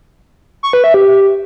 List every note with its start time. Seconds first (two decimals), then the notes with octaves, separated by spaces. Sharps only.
0.63 C#6
0.73 B4
0.84 E5
0.94 G4